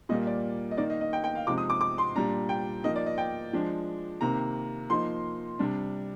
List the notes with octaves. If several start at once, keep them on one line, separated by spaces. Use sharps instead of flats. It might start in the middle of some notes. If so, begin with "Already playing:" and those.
A#2 G3 A#3 D#5
D5
D#5
D#3 A#3 D#4 D5
D#5
D#5
G5
G5
F5
C3 F3 G#3 D#4 D6
D#6
D6
D6
C6
A#2 G3 D4 A#5
G5
F3 A#3 D#4 D#5
D5
D#5
G5
F3 G#3 D4
C3 D#3 A#3 A#5
F3 A#3 D#4 C6
C3 G3 D4